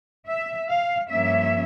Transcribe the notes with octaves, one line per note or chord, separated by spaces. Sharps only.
E5
F5
G2 F3 A#3 C#4 E5